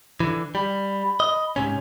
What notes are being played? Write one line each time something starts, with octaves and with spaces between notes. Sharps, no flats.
D3 E3
G3 B5
D#5
G#2 C3 C#4 G#5